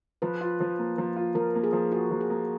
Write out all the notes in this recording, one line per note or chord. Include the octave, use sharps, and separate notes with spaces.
F3 B4
F4
F3
A#3
F3
F4
F3 A#4
A#3
G#4
F3
F4 F#4
F3
G#4
A#3